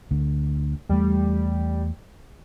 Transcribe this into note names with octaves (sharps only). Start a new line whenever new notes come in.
D2 D3
E2 G3 A3